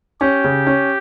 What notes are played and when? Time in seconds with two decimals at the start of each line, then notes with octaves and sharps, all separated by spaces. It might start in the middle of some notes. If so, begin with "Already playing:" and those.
0.21 C#4 G4
0.44 C#3
0.67 C#4